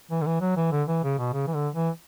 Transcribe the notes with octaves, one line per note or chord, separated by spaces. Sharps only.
E3
D3
E3
F#3
E3
D3
E3
C#3
B2
C#3
E3
D3
E3